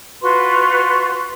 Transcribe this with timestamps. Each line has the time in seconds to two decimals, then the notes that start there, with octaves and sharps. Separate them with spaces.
0.21 F4 F#4 B4 C6